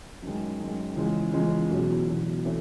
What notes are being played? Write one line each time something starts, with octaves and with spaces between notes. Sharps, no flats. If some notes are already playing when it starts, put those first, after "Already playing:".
F#2 D#3 G#3
F#2 D#3 G#3
E2 C#3 F3 G#3
E2 C#3 F3 G#3
E2 B2 F#3
E2 B2 F#3
C3 E3 A3 C#4